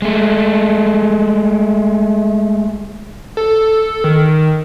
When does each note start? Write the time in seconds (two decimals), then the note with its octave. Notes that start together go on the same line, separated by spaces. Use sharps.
0.02 G#3 A3
3.37 A4
4.04 D#3